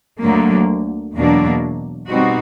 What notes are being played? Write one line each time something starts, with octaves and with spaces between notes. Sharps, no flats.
D2 D3 F#3 A#3
E2 B2 F#3 A#3 D4
B2 G3 C4 D#4 F#4